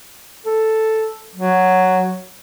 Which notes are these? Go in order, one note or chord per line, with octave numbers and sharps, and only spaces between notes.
A4
F#3